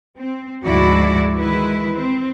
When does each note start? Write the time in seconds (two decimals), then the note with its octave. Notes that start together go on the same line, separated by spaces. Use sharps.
0.18 C4
0.63 D2 G#2 F3 E4 F#4 D5
1.37 D#3 E3 G#3 E4 B4
1.92 C4